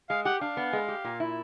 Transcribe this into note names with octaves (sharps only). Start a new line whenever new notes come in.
G#3 F5
G4 F#5
D4 F5
B3
G#3
G4
A#2
E4